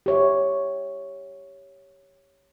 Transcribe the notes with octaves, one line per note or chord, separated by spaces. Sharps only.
G4 C#5 E5